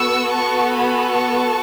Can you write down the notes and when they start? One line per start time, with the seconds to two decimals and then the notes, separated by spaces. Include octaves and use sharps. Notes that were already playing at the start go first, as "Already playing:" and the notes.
Already playing: B3 F#4 A4 C#6 E6
0.32 A5 C#6
0.73 G#5 B5
1.15 A5 C#6